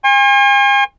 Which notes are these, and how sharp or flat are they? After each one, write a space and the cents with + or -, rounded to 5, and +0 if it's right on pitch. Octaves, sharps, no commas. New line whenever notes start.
G#5 -40 C6 +45